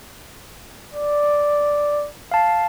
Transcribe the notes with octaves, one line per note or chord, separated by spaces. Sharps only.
D5
F5 A5